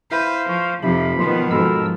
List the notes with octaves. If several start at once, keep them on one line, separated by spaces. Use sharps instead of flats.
E4 B4 C5 E5 F5 G6
F3 C#6
F2 C3 F3 D#4 G4 E5 B5
B2 D#3 F3 B3 C6
G#2 F3 F#4 A4 A#4 B5 E6